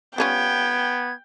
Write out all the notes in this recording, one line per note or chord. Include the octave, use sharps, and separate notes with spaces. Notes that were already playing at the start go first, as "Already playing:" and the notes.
G3 B3 C#4 F4 G5 G#6